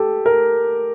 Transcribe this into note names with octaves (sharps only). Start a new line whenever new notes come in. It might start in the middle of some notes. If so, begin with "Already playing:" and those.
Already playing: G4 A4
A#4